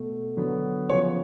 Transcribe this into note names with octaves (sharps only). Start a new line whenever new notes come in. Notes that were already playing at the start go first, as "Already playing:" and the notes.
Already playing: B2 A3
D3 F#3 B3
C#3 F3 B3 C#5